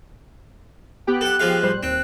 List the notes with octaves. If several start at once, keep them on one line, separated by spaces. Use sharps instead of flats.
B3 G4 G5 F#6
A4 F#5
F3 G#3 F5
A2 G3 C5
D#2 C4